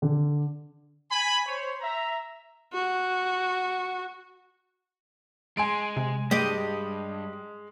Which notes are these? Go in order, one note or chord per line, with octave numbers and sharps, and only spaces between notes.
D3
G#5 B5
C5 C#5
E5 A#5
F#4
G#3 G#5 C6 D7
C3
G2 G#3 G4 D#5